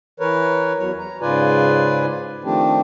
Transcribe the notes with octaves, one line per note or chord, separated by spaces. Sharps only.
E3 A#4 B4 C#5
E2 F#3 C#5
A#5
G#2 C#3 F4 B4 D5 G#5
D#3 F3 A3 C4 D4 G4